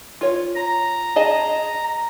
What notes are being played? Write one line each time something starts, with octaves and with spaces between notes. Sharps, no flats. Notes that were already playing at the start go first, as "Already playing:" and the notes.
F4 C#5
A#5
G#4 D#5 A5